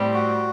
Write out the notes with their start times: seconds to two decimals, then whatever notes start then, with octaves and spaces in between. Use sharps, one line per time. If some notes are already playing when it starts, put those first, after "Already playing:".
Already playing: A2 G3 C4
0.14 F#4